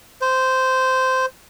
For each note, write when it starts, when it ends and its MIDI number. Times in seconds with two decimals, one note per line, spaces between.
0.21 1.26 72